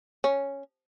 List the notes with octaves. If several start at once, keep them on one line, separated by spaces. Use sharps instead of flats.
C#4